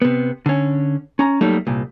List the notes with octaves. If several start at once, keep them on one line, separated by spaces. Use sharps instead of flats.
C3 B3
D3 C#4
C#4 A#5
F#3 G3 A3 A#3 D#4
C2 A#2